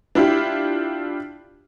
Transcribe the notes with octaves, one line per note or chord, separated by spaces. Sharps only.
D4 E4 F4 G4